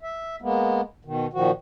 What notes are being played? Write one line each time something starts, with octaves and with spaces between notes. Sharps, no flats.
E5
G#3 A#3 B3
B2 D#3
A#2 D#3 F3 F#4